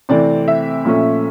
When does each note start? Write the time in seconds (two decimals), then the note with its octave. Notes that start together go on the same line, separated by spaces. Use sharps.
0.09 C3 E3 A3 C4 D5
0.48 E5
0.85 A#2 F3 A3 C#4